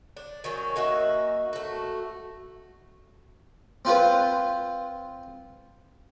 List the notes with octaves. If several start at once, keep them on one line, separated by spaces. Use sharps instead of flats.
D4
D#3 F#3 C#4
A#3 D#4 F#4 E5
A3 F#4
C4 F4 B4 C5